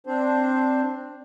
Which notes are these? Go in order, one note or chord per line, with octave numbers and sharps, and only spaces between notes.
C4 D4 C5